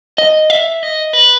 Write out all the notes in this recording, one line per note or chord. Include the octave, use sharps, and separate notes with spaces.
D#5
E5
D#5
B4